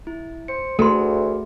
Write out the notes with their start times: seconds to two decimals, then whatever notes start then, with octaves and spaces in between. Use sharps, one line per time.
0.07 E4
0.48 C5 C#7
0.79 D2 A3 F#4 G#4 A4 B4 C6